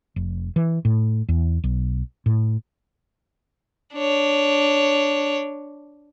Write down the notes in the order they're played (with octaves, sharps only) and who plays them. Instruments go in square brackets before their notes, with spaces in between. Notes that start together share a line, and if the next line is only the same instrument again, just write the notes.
[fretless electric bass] F1
E3
A2
E2
B1
A2
[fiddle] D4 C#5